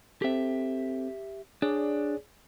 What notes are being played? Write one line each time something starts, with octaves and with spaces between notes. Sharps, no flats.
C4 G4 A4 E5
D4 G#4 C#5 D5